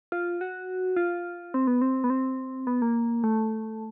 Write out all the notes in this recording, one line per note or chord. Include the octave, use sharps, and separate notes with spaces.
F4
F#4
F4
C4
B3
C4
B3
C4
B3
A#3
A3